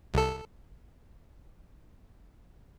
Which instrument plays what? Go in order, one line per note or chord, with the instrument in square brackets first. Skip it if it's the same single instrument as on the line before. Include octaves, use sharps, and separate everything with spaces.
[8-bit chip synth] C2 A4